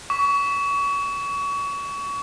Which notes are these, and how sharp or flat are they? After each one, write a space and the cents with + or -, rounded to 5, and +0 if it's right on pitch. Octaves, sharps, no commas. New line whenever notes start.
C#6 +30